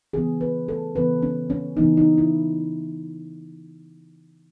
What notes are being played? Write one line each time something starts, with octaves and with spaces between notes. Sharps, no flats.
C#3 E3 B3 G#4
B4
A4
C#3 E3 B3 B4
C#4
C#4
C#3 E3 B3 D#4
D#4
E4